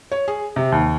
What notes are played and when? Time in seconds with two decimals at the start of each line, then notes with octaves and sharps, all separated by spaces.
0.12 C#5
0.28 G#4
0.56 C3
0.72 D#2